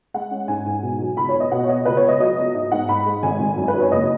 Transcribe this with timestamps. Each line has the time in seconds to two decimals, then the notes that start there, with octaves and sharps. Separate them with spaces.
0.14 G#3 F#5
0.31 C#4
0.48 G#2 G#5
0.66 G#2
0.82 B2
1.00 F#3
1.17 C#2 B5
1.29 C#5
1.34 B3
1.40 D#5
1.51 B2 F#5
1.64 C#5
1.68 B3 D#5
1.85 C#2 B4
1.97 C#5
2.03 C#2
2.08 D#5
2.20 F#3 D#5
2.37 B3
2.54 G#2 D#5
2.72 G#2 F#5
2.88 G#2 B5
3.06 G#3
3.23 G#1 G#5
3.40 G#1
3.57 F#2
3.68 B4
3.74 F#3
3.80 C#5
3.92 F#1 D#5